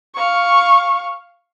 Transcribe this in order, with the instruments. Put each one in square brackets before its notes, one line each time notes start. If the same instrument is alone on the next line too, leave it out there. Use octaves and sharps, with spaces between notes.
[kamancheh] F5 C#6